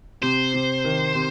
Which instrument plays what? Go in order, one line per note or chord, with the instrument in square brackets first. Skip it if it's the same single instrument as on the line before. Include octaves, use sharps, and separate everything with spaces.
[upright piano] C3 [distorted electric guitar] C5
[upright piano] C3
D#3
C3